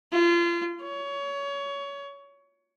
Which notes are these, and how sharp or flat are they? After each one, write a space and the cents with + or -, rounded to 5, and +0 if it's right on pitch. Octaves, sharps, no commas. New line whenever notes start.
F4 -30
C#5 +25